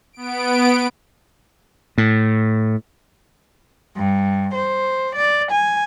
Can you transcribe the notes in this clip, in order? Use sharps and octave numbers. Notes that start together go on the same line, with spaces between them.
B3 D7
A2
G2
C5
D5
G#5